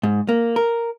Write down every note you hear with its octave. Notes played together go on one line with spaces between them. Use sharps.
G#2
A#3
A#4